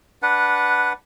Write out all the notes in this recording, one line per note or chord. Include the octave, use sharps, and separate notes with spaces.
D4 B4 F#5